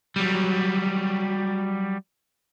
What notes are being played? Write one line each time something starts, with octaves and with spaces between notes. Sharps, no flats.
F#3 G3